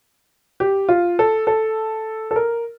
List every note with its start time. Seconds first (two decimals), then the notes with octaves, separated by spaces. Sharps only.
0.60 G4
0.89 F4
1.19 A4
1.47 A4
2.31 A4
2.36 A#4